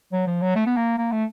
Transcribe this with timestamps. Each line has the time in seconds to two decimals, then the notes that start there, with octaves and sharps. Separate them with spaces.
0.12 F#3
0.27 F3
0.41 F#3
0.56 A3
0.66 B3
0.76 A#3
0.98 A#3
1.12 A3